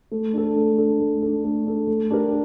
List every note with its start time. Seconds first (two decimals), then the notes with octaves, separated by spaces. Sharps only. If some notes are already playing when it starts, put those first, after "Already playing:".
0.11 A3
0.33 D4 A4
0.56 A3
0.78 D4 A4
1.00 A3
1.23 D4 A4
1.44 A3
1.66 D4 A4
1.87 A3
2.10 D4 G4 A#4